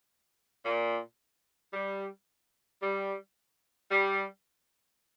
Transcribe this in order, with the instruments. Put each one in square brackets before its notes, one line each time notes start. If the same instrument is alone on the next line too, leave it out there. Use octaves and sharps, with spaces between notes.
[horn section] A#2
G3
G3
G3